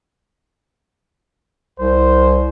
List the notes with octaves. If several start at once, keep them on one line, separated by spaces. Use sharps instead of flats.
C2 C5